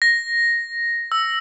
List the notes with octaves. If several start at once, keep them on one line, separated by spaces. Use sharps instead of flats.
A#6
E6